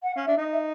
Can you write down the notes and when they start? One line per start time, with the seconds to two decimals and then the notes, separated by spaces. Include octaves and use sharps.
0.03 F#5
0.14 C#4 F5
0.25 D4 E5
0.37 D#4 D#5
0.52 E5